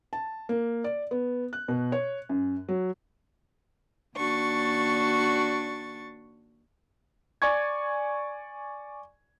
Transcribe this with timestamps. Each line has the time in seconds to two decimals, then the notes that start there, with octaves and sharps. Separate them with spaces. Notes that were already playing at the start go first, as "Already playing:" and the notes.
0.13 A5
0.49 A#3
0.84 D5
1.11 B3
1.53 F#6
1.68 B2
1.92 C#5
2.29 F#2
2.69 F#3
4.16 D#2 D4 F#4 C#6 A6
7.42 D5 G#5 C#6 G#6